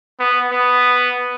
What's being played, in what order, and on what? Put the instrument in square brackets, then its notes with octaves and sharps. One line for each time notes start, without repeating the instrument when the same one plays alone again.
[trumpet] B3
B3